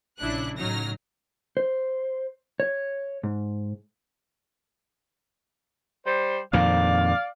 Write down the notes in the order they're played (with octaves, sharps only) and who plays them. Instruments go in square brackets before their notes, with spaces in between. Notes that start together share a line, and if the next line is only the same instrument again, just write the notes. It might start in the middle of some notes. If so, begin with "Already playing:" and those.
[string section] A#1 C#3 D4 E4 F#6
A2 C#3 F#3 D#4 F6 A#6
[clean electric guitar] C5
C#5
G#2
[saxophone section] G3 C5
[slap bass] F2 A#2 D#3 [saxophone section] D5 F5